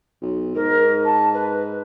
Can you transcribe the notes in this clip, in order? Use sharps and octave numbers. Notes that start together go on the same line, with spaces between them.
B1
G#2 A#4
A5
B4